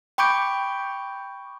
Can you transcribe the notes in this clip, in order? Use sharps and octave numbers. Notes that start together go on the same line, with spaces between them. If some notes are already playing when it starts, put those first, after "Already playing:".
G5 B5 C#6 D6 G6 D7